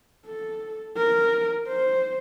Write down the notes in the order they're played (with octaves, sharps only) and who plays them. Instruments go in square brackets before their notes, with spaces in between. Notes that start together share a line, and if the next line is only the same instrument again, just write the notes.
[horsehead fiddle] A4
A#4
C5